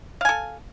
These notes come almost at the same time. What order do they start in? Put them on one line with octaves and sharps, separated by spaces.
F5 G#5 A4